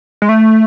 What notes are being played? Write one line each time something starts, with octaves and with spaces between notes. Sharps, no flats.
G#3
A3